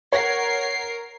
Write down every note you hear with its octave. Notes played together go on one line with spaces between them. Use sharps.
A#4 C#5 F#5 C7